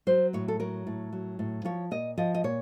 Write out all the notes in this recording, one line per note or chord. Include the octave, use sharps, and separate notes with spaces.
F#3 C5
A2 C#5
A4
F#3 A#4
A2
F#3
A2
F3 C#5
A#2 D#5
F3 D#5
D#5
A#2 C#5